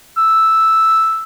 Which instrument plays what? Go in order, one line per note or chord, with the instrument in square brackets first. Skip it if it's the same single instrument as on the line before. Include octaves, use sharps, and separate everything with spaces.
[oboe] E6